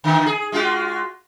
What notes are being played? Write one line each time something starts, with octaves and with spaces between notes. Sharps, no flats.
D3 D#3
G#4
G#3 F4 F#4